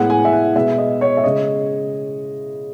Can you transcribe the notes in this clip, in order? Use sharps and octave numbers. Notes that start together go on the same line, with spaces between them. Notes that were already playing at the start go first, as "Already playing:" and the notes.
Already playing: A2 G#3 B3 F#5
G#5
E5
F#5
B2 G#3 B3 E5
D#5
C#5
E5
C#3 G#3 D#5